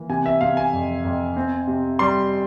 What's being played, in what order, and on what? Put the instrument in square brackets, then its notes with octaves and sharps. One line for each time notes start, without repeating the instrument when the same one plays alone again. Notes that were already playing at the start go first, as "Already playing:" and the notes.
Already playing: [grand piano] E3 A#3
C3 G#5
E5
C3 F5
G#5
F2
F2
C4
C3
G3 C6